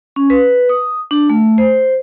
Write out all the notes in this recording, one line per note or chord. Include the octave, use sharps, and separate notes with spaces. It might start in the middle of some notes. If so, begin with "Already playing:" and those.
C#4
B4
D#6
D4
A3
C5